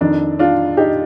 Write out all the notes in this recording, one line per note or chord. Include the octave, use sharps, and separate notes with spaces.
F2 D#3 D4
D4 F4
D#4 G4